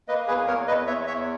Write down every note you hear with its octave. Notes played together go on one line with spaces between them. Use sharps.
A#3 B4 D#5
E2 G#4 B4
E2 A#4 C#5
E2 B4 D#5
E2 C#5 E5
E2 C#5 E5